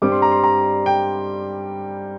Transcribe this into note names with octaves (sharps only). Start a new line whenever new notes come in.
G2 G3 C4 D6
C6
A#5
C6
A#5
G5